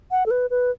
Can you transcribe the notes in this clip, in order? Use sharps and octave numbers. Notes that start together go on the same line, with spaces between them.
F#5
A4
B4
B4